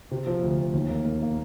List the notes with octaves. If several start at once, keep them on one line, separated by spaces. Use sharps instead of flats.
C3
F3
D2
D2
D#2
A#3
A#3
A#3